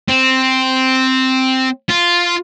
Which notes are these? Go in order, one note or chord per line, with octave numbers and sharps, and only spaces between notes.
C4
F4